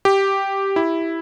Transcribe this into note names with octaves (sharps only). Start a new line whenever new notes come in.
G4
E4